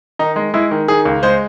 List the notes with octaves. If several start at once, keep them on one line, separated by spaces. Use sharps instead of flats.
D#3 D#4
G#3
G#3 E4
D#3
D#3 G#4
C#2
G#3 C5